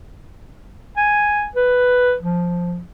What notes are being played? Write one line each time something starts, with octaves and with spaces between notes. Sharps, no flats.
G#5
B4
F3